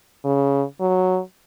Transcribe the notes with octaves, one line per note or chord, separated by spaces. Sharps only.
C#3
F#3